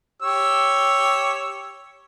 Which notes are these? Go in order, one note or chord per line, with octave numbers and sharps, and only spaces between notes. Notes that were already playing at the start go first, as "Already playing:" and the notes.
G4 C#5 E6